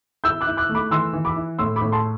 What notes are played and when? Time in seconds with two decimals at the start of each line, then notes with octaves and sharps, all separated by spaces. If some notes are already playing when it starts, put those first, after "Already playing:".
0.24 E4 E6 G6
0.41 D6 F#6
0.47 E4
0.57 D6 F#6
0.69 A3
0.75 B5 D6
0.91 E3 C6 E6
1.13 E3
1.25 B5 D6
1.36 E4
1.59 A2 C6 E6
1.76 B5 D6
1.82 A2
1.92 A5 C6